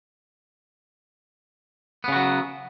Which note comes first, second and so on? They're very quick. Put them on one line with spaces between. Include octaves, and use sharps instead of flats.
B3 C#3 F#4 F#3